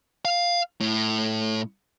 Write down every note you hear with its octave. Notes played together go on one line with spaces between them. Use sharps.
F5
A2